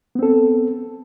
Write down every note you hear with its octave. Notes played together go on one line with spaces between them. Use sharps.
B3 C4 A4